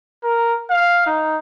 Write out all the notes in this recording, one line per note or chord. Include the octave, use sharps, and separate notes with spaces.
A#4
F5
D#4